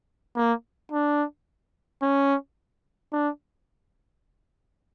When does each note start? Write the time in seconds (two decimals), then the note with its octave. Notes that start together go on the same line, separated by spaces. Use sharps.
0.36 A#3
0.92 D4
2.02 C#4
3.13 D4